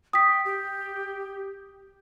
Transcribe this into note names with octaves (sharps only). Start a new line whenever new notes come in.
G5 D#6 B6
G4